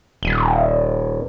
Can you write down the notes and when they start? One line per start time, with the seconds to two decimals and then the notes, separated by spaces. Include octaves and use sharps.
0.23 D#1